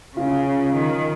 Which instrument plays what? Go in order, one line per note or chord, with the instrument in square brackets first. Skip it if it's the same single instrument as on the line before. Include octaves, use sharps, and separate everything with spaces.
[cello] C#3 [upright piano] F4
[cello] D#3